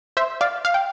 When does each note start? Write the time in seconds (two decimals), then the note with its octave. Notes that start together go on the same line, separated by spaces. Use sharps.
0.17 C5 E5
0.41 D5 F5
0.65 F5
0.74 G5